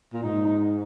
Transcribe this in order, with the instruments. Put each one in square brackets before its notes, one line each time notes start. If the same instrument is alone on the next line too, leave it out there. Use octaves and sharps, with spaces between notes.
[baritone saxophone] A#2
[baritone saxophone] G#2 [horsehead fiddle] D#4